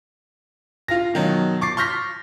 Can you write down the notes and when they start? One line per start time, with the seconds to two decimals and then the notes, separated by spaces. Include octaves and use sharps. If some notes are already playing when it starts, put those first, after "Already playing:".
0.88 F4 F5 A#6
1.14 B2 D#3 F#3
1.61 C#6 D6 A6 C7
1.77 C6 C#6 F6 G6 A#6 B6